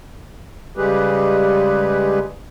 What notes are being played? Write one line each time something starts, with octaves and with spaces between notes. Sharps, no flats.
C#3 G3 G#3 G4 G#4 B4